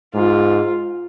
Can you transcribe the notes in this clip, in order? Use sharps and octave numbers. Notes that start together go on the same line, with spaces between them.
G#2 F4